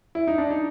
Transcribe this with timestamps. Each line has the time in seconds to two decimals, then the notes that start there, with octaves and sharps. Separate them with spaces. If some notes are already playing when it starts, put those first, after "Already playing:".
0.15 E4
0.28 D#4
0.38 D4
0.50 D#4